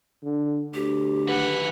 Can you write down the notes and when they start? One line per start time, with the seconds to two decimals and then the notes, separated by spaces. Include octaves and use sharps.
0.23 D3
0.74 D2 G4
1.29 D#3 B4 F#5